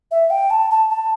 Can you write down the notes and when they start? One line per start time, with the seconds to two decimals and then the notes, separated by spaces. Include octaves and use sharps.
0.11 E5
0.30 G5
0.50 A5
0.71 A5
0.90 A5